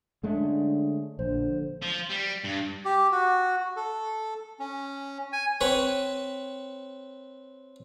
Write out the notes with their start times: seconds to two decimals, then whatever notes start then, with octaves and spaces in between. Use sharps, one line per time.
0.23 D3 G#3 A3 C#4
1.19 A#1 D3 C5
1.83 F3
2.10 G3
2.44 G2
2.85 G4
3.12 F#4
3.76 A4
4.60 C#4
5.33 G#5
5.61 C4 B4 C#5